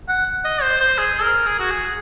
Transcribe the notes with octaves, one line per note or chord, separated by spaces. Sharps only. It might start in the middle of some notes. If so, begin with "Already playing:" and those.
F#5
D#5
C5
C5
G#4
A#4
G#4
F#4
G#4